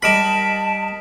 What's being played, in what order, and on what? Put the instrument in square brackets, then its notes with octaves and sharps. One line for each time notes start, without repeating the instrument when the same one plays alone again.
[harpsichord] G3 B5 [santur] A#4 D#5 [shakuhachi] A5 [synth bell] B6 D7 E7